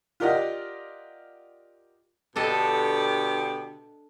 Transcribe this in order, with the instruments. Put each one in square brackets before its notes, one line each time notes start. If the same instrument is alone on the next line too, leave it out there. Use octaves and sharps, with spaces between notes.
[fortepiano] F4 G4 A#4 D5 D#5 F#5
[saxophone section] B2 D3 G4 [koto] D4 A4 D#5